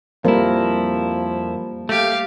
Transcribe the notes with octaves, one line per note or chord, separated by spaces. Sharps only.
F2 F3 G3 A#3 E4 A#4
A3 G4 F5